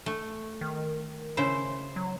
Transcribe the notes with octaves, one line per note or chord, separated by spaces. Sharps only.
A3
D#3
C#3 E4 C5
F#3